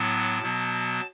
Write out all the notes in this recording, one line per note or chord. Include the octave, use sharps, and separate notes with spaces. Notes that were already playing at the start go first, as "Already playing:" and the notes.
Already playing: A2 F#3 B3 A5
B2 F#3 B3